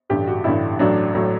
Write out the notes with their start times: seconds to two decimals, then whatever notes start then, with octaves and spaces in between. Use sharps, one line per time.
0.10 A1 G2 D3 G4
0.27 F#4
0.44 A1 G2 D3 E4
0.79 A1 A2 F#3 D4
1.15 A2 F#3